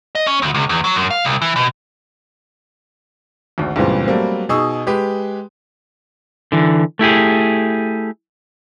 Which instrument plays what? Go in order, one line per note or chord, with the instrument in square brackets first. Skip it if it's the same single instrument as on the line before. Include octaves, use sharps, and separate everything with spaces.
[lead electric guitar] D#5
C#4
D2
C#2
E2
F#3
F#2
F5
C2
E3
B2
[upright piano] G#1 D2
C#2 G2 A#2 E3 C4
F#3 G3 A3 A#3 C4
B2 D#4 G#4 C#6 E6
G#3 G4 B4
[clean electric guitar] D3 E3
A3 E4 G4 G#4